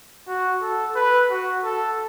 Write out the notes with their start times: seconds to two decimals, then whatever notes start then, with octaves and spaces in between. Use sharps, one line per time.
0.28 F#4
0.62 A4
0.95 B4
1.30 F#4
1.64 A4